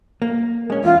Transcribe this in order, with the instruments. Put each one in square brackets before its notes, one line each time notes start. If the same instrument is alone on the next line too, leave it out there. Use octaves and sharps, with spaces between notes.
[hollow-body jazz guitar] A#3
G#3 C#4
[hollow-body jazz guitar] E2 [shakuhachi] F4